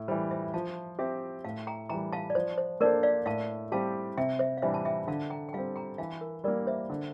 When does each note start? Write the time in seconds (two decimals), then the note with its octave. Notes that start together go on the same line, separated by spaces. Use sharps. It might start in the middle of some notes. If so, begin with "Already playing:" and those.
Already playing: A2
0.08 E3 G3 C5
0.31 C5 E5
0.54 F3 F5 A5
0.99 C4 G4 E5 G5
1.44 A2 F5 A5
1.67 G5 A#5
1.89 E3 G3 G5 A#5
2.13 F5 A5
2.30 D5
2.35 F3 C5
2.58 C5
2.80 A#3 D4 A4 A#4 C5 D5
3.03 D5 F5
3.26 A2 F5 A5
3.72 G3 C4 G4 F5 A5
4.17 C3 E5 G5
4.39 C5 E5
4.57 F5
4.62 E3 G3 D4 C5 E5
4.74 A5
4.85 E5 G5
5.07 D3 F5 A5
5.30 G5 A#5
5.49 G5
5.53 G3 C4 F5 A5
5.76 G5 A#5
5.98 E3 F5 A5
6.21 A#4
6.44 G3 A#3 A#4 D5
6.67 C5 E5
6.90 D3